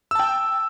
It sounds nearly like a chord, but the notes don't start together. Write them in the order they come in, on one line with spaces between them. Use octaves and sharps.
E6 A5 G5